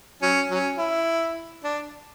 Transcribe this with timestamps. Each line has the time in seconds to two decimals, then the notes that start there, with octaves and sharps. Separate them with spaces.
0.22 F#3 C#4
0.50 F#3 C#4
0.78 E4
1.64 D4